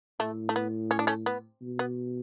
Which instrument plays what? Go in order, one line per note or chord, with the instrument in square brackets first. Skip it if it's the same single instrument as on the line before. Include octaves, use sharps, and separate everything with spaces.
[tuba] A2 [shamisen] A3
[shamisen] A3
B3
C#4
D4
A3 C#4
B3
[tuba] B2
[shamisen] B3